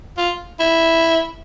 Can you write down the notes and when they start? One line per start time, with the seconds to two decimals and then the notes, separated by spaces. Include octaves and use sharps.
0.18 F4
0.59 E4